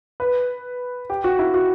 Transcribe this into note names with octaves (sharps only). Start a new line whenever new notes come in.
B4
G4
F#4
E4
F#4